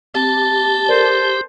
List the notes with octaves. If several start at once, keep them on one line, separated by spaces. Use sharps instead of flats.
C4 G4 A5
A4 A#4 C5 D5